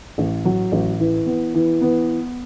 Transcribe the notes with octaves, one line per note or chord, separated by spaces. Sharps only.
A1
F#3
A1
E3
B3
E3
B3